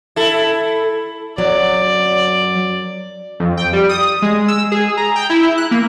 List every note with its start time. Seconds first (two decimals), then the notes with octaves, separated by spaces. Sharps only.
0.16 E4 A4
1.38 F#2 F#3 D5
3.40 F2
3.57 G5
3.73 G3
3.89 D#6
4.22 G#3
4.48 E6
4.72 G#4
4.97 A#5
5.16 G5
5.30 E4
5.58 F#6
5.71 A#3